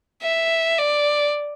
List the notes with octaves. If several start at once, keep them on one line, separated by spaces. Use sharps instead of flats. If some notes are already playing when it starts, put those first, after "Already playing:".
E5
D5